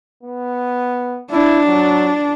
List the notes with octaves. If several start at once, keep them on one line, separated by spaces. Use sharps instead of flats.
B3
D4 E4
F#3